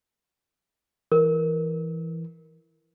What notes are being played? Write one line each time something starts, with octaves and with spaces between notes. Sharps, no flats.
E3 A#4